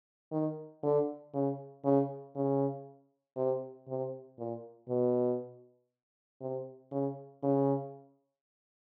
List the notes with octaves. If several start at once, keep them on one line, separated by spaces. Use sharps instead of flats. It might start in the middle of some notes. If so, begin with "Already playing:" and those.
D#3
D3
C#3
C#3
C#3
C3
C3
A#2
B2
C3
C#3
C#3